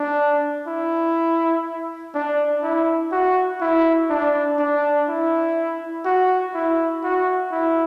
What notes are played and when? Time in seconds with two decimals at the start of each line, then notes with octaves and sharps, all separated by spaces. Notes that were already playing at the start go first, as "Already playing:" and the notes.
Already playing: D4
0.67 E4
2.14 D4
2.63 E4
3.12 F#4
3.61 E4
4.10 D4
4.59 D4
5.08 E4
6.05 F#4
6.54 E4
7.03 F#4
7.52 E4